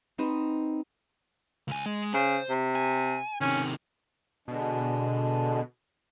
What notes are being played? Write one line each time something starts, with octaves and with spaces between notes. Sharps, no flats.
C4 D#4 F#4 B4 C5 D#5
C#2 G#5
G#3
C#3 C5
C3
G#5
C3 D#3 C#4
B2 D3 G#3 D4